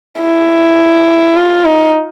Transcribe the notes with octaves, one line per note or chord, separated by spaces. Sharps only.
E4
F4
D#4